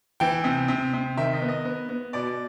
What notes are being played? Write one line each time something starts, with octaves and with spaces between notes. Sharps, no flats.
E3 G5
C3
C3
C3
D#3 E5
D#5
B3
D#5
B3
B3
B2 D5